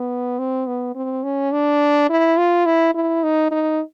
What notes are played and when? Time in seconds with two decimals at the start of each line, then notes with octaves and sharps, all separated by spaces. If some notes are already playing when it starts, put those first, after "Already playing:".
Already playing: B3
0.39 C4
0.67 B3
0.95 C4
1.23 C#4
1.52 D4
2.10 E4
2.38 F4
2.66 E4
2.95 E4
3.23 D#4
3.51 D#4